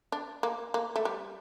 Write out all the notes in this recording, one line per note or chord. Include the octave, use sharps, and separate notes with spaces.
D4
A#3
A#3
A3
G3